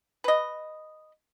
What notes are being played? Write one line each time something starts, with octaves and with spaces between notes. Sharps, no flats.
B4 D#5